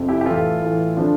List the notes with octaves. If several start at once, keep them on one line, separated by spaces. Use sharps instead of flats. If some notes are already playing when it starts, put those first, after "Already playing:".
Already playing: F2 C3 F3
E4 G4
G4
A2 E3 F4 A4
A2 E3
D3 F3 D4 F4